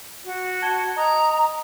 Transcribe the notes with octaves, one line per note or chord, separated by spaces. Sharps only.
F#4
A5 G#6 G7
D#5 A#5 D#6